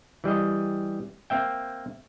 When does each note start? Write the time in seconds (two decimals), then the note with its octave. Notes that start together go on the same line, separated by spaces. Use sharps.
0.24 E3 G3 G#4 D#5
1.30 A#3 C4 E5 G5